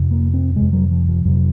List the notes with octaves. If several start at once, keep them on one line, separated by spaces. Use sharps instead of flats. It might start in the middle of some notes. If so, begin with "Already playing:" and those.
Already playing: F2 C3
A#3
C4
F2 C3 G#3
F#3
F3
F3
F2 C3 F#3